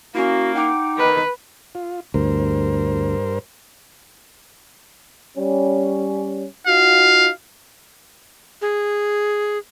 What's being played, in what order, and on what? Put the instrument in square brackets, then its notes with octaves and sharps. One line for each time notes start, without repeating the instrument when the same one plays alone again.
[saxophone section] A#3 [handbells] C#4 E4 [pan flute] F#4
[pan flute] D#4 [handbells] F#5 G5 D6
[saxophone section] D#3 [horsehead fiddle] B4
[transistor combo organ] F4
[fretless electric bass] D2 [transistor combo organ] G2 A#4 C5
[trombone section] G3 C#4
[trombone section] D#4 F4 F#4 [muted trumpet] F5
[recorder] G#4